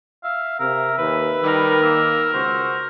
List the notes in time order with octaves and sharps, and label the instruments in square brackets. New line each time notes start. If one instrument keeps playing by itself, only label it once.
[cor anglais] E5 [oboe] F5
[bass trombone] C3 [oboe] A#4 [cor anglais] E5
[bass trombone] D#2 [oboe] B4
[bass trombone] D#3 [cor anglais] G3 [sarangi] A#4
[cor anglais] A#3 [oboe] E6
[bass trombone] C#2 [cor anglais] F#4 [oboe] C5